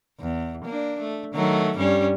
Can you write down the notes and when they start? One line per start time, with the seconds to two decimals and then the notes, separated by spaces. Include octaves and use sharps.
0.20 E2
0.65 A#3 D4
1.00 A3
1.34 D#3 F#3 A3
1.78 G2 G3 C#4